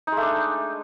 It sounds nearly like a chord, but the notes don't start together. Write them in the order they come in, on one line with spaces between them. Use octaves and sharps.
D#4 G#3 A3 D4